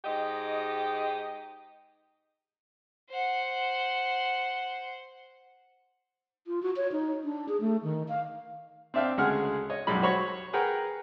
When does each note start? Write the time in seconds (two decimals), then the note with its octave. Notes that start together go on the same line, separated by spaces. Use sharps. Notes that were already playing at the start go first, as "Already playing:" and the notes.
0.05 G#2 G4 D#5
3.10 C5 F#5
6.47 F4
6.62 F#4
6.76 C#5
6.92 D#4
7.24 D4
7.48 G#4
7.61 A3
7.83 D#3
8.09 F5
8.94 C4 D4 E5 F5 G5
9.18 D2 C#3 G#3 G#4 F#5 F6
9.70 C#5 D#5
9.87 B1 F#2 G3 G#3 B5
10.02 F#4 C5 C#5 B5 C#6
10.53 G#4 A#4 B4 F#5 G5 A#5